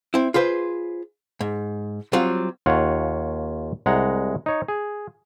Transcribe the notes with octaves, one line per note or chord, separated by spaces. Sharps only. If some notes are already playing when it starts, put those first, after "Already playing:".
C4 E4
F4 G#4 B4 C5
G#2
F#3 G3 C4 F4
D#2 F4 C#5 F#5
C2 G#3 F#5 A#5
D#4 C#5
G#4